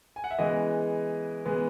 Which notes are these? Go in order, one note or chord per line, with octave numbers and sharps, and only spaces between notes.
G#5
F#5
E5
C#3 E3 G#3 B3 D#5
C#3 E3 G#3 B3